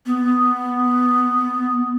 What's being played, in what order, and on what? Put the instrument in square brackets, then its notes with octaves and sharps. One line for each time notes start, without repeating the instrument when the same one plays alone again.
[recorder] B3